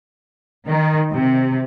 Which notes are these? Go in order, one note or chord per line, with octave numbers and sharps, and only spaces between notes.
D#3
C3